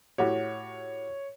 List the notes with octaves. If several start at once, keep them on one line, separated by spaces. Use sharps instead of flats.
A2 F#4 G4 C#5